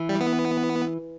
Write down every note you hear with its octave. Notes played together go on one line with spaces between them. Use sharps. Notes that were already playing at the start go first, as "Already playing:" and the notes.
Already playing: E3
G3
B3